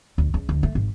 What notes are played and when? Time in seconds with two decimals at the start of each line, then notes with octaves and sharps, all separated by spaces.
0.18 D2
0.34 C#2
0.49 D2
0.63 A3
0.75 G#1